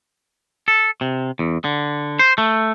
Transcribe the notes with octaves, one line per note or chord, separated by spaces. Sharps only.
A4
C3
E2
D3
C5
A3